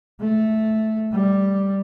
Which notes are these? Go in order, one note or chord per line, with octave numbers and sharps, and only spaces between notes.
A3
G3